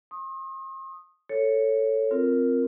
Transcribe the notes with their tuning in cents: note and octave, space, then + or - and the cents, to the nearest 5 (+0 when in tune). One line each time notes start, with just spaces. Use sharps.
C6 +45 D#6 +0
A4 +10 C#5 +0
C4 +0 F4 +0 A#4 +0